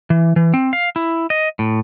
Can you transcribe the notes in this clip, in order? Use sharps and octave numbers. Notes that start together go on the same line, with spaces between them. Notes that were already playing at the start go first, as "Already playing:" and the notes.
E3
E3
C4
F5
E4
D#5
A2